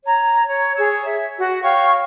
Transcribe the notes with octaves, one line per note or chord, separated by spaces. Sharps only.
C#5 A#5
C#5
G#4 C#5 E6
E5
F#4
C#5 F5 G5 C#6